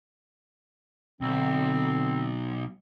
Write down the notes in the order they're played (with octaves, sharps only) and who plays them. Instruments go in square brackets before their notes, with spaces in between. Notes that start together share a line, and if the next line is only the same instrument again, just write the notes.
[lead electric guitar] B1 [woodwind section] D3 C4